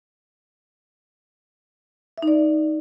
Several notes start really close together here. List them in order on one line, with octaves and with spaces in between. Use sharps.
E5 D#4 D5